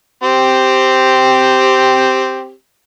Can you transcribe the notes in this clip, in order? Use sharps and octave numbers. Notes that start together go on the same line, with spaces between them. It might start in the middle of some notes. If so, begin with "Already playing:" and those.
C4 G4